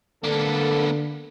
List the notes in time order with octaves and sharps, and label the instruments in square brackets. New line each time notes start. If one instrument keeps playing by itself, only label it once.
[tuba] D3 [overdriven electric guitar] A#3 B3 [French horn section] D4 A4